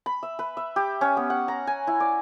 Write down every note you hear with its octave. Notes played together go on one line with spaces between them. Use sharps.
B5
E5
B4
E5
G4
C#4
B3
F#5
A#5
G#5
E4
D5